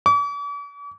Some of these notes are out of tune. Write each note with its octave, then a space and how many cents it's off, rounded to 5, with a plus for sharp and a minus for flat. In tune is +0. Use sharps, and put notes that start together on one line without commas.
D6 -45